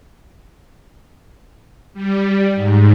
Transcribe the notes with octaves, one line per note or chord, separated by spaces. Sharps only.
G3
G#2